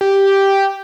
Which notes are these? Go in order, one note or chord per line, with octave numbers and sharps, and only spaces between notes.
G4